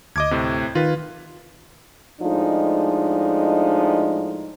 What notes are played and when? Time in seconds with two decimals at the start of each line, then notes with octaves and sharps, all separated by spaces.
0.16 D2 D#5 D6 G#6
0.31 A2 C3
0.75 D#3 F4 B4
2.21 A2 F3 G#3 D4 D#4